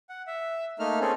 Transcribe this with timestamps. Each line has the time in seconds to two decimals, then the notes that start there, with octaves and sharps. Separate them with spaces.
0.09 F#5
0.27 E5
0.79 A3 A#3 D#4 F6
1.01 C4 C#4 G#4 A4